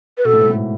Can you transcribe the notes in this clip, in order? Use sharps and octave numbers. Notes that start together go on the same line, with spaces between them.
B4
B2 A4
A2
G#2
A2